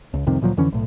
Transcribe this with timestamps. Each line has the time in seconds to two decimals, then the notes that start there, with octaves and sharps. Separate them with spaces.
0.14 C#2
0.27 C2 F2 C3 D#3
0.41 D2 A#2 F3 F#3
0.57 F2 D3 E3 C#4
0.72 B1 A2